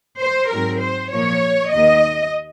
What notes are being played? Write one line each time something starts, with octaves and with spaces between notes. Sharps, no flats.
C5
G#2 F#3 C4 A#4
C5
A#2 F3 A#3 C#5
D#2 D#3 A#3 D#5